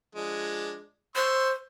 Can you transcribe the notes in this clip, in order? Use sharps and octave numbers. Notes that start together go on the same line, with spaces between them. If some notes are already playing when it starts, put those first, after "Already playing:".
F3 G#3 D4
C5 C6 C#6 E6